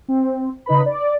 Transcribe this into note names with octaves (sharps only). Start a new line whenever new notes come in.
C4
C#3 D#4 B4 B5
D5